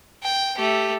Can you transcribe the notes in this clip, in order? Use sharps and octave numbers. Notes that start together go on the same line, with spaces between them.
G5
A3 G4